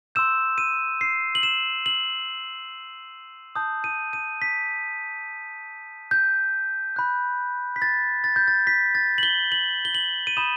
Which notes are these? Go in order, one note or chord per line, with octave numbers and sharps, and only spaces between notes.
C6 E6 G6 E7
D#7
C7
F#7
E7
F#7
A5 D#6 G6
D#7
D#7
B6
G6
B5 F#6
B6
A6
A6
G6
A6
B6
A6
F#7
G7
F#7
G7
F#7
D#7
B5 D#6 G6 E7